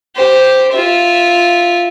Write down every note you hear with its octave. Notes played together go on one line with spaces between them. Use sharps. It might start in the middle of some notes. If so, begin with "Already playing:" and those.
G4 C5
F4 E5